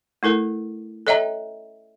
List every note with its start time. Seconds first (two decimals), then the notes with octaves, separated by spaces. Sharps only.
0.23 A3 E4 A4 A#4
1.07 A4 C#5 D#5 E5 G5 A#5